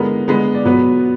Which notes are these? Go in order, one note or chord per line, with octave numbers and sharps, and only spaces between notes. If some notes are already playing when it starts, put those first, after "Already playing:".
Already playing: D3 G#3 B3 A#4
D3 G#3 B3
D5
B2 F#3 B3 B4